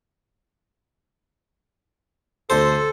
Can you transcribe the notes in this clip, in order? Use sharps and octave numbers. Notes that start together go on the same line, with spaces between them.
D2 A4 C5